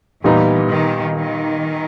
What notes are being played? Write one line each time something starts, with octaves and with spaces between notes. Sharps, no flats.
A#2 E3 G3 B3 D#4
D#3
D#3